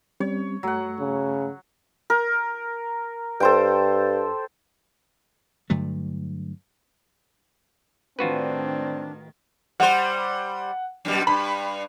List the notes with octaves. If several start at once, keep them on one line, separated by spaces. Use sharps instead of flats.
G3 C4 C#4 C#5
G2 F#3 A3 F#5
C#3
A#4
G2 A4 C5 G5
G2 D3 F#3 A3
A2 D#3 C4 D4 F4 F#4 B4
G3 C5 F#5
F#2 B2 G3
G2 B5